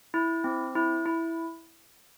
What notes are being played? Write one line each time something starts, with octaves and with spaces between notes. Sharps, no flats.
E4
C4
E4
E4